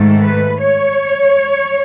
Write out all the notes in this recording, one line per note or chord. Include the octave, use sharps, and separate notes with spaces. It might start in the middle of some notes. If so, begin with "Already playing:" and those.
Already playing: G#2 D#3 A3
B4
C#5